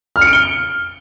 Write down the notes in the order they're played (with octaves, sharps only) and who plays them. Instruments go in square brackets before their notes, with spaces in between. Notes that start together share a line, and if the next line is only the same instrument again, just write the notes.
[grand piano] F6
C#7
D7
G7